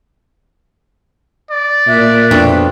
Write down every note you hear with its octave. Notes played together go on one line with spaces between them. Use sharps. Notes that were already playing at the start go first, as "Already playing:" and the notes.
D5
A#2 E5 F#6
F2 B2 D4